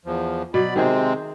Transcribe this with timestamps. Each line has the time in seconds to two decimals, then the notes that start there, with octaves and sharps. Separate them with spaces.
0.05 E2 F3
0.54 B2 F#3 D5 B5
0.76 C3 D#3 G#3 C4 G#4 C5